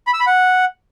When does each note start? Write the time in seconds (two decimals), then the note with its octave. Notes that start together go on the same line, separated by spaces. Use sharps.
0.07 B5
0.14 E6
0.20 B5
0.26 F#5